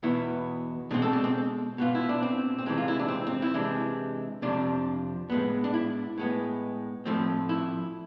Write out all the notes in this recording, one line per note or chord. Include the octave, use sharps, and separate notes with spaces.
E2 B2 B3 E4
B2 G#3 C4 D4
A4
D4
C4
B2 B3 F4
E4
D4
C4
C4
C3 E3 G#3 D4
F4
E4
D4
C4
C4
E4
C3 E3 G#3 D4
F2 C3 F3 D4
A2 G#3 B3
D4
E4
A2 G#3 B3
A2 F3 A3 C4
E4